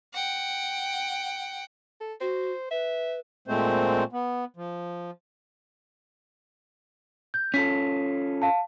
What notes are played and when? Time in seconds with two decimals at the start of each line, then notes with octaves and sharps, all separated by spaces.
0.14 F#5 G5
2.00 A4
2.21 F#4 C5
2.71 B4 E5
3.48 A#2 G#3 A3 C4 C5
4.13 B3
4.56 F3
7.34 G6
7.54 C#4 F4 A4 B6
8.42 F5 A5